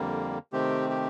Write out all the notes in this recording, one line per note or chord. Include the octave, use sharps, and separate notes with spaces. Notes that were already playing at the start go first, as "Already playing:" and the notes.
Already playing: F2 D3 G3 A#3
C3 D#3 A3 C4 G4
G4